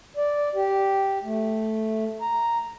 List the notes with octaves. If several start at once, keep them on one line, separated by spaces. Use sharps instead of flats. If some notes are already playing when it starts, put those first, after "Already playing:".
D5
G4
A3
A#5